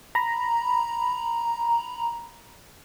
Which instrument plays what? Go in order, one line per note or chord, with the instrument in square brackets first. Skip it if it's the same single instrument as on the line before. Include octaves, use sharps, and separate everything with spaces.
[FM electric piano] A#5 B5